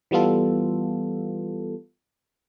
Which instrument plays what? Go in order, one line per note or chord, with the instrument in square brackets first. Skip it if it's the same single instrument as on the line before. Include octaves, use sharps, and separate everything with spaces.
[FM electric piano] E3 G3 B3 F4 A4